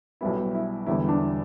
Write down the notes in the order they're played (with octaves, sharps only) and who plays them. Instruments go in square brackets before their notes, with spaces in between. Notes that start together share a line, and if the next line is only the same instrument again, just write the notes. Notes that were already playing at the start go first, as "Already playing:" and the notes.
[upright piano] B1 B2 G3 B3 E4
E4
E1 E2 D3 G3 B3 E4
D4